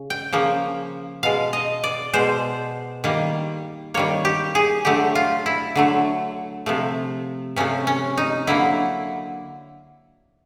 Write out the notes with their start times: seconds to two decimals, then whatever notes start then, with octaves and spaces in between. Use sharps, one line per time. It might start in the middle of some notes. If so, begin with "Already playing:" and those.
Already playing: C#3
0.10 G5
0.32 C#3 F3 A#3
1.23 B2 G#3 F5
1.53 D#5
1.84 D5
2.13 B2 G#3 C5
3.04 D#3 G3 A#3
3.94 D#3 G3 A#3 C#5
4.25 G4
4.55 G#4
4.85 D3 F#3 A3 G4
5.15 F4
5.46 E4
5.76 D3 F#3 A3
6.66 C3 F3 A3
7.56 C3 F3 A3 C#4
7.87 C#4
8.17 D#4
8.47 D3 F#3 A#3 E4